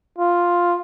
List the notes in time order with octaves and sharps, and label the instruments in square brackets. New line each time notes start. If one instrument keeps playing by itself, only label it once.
[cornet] F4